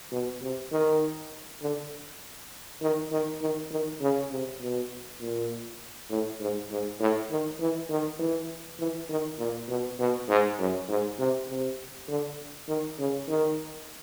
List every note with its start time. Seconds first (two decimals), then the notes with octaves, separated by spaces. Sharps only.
0.12 B2
0.42 C3
0.72 D#3
1.61 D3
2.81 D#3
3.11 D#3
3.41 D#3
3.71 D#3
4.01 C#3
4.31 C3
4.61 B2
5.20 A#2
6.11 A2
6.40 G#2
6.70 G#2
7.00 A2
7.30 D#3
7.60 E3
7.90 D#3
8.19 E3
8.80 E3
9.09 D#3
9.39 A#2
9.69 B2
9.99 B2
10.29 G#2
10.59 F#2
10.89 G#2
11.19 C3
11.48 C3
12.08 D3
12.68 D#3
12.98 C#3
13.28 D#3